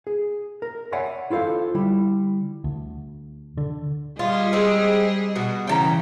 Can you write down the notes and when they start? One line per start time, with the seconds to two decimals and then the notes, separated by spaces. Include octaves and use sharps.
0.07 G#4
0.62 A#4
0.92 C#5 D5 E5 F#5 G#5 B5
1.30 E4 F4 A4 C5 F5
1.74 D3 G3 E4
2.64 D2
3.57 D3
4.19 G3 F4 G#4 D#5
4.53 G#3 C4
5.35 B2 F#4
5.67 C#3 E3 G5 A5 A#5